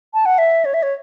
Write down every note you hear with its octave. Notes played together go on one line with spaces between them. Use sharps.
A5
F#5
E5
C#5
E5
C#5